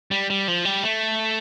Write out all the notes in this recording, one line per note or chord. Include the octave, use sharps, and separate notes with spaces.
G3
G3
F3
G3
A3